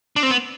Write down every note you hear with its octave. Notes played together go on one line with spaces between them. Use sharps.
D4
C4
B3